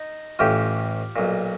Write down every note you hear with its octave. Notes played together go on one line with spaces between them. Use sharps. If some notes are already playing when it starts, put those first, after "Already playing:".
Already playing: D#4
A1 A2 E3 F4 G4
B1 A#2